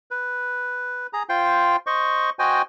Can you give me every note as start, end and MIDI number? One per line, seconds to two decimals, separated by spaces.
0.11 1.07 71
1.13 1.23 68
1.13 1.23 82
1.29 1.76 65
1.29 1.76 72
1.29 1.76 79
1.29 1.76 84
1.87 2.30 72
1.87 2.30 75
1.87 2.30 85
2.39 2.62 66
2.39 2.62 72
2.39 2.62 75
2.39 2.62 79
2.39 2.62 80